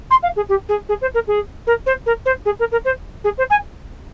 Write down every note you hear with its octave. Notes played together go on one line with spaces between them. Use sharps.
C6
F5
G#4
G4
G#4
G#4
C5
A#4
G#4
A#4
C5
A#4
C5
G#4
A#4
A#4
C5
G#4
C5
G#5